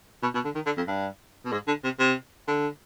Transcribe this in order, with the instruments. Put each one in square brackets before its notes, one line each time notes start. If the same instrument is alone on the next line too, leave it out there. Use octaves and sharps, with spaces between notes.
[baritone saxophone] B2
B2
D3
D#3
D3
F2
G2
B2
G#2
D3
C3
C3
D3